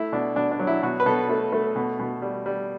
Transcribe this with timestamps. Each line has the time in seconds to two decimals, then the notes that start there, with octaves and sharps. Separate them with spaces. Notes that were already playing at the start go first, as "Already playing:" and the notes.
Already playing: A3 E4
0.12 B2 D4
0.36 B2 D4
0.51 D4
0.59 F#3
0.67 E4
0.83 B2 F#4
1.00 B4
1.06 B2 A4
1.29 A3
1.52 A3
1.76 B2
1.99 B2
2.22 G3
2.46 G3